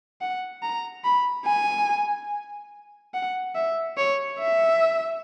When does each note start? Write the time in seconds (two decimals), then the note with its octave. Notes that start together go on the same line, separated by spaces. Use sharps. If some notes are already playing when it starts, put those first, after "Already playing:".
0.21 F#5
0.62 A#5
1.04 B5
1.47 G#5
3.14 F#5
3.55 E5
3.97 C#5
4.39 E5